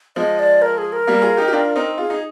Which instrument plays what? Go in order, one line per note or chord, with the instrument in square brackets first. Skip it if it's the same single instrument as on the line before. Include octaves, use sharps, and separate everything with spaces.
[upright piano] F3 G#3 [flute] D#5
[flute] D5
A#4
G#4
A#4
[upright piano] G3 A#3
F4 G#4
D#4 G4
G4
D4 F4
C4 D#4
[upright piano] F4 [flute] G#4
[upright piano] D#4